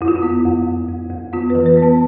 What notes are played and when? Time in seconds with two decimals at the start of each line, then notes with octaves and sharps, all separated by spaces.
0.01 F2 E4
0.08 F4
0.16 E4
0.23 B3
0.46 F2
0.68 F2
0.89 F2
1.10 F2
1.33 B3 F4
1.50 B4
1.55 E3
1.66 B4
1.77 B3
1.82 A5